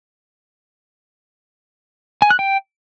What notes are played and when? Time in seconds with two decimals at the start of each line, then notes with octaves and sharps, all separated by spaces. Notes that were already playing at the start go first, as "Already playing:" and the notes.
2.22 G#5
2.30 F#6
2.39 G5